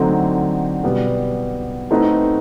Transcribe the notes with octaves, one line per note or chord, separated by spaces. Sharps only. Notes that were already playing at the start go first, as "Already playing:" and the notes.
Already playing: D3 F#3 A3 C4 D#4
B2 G3 B3
A3 C4 D#4 F#4 B4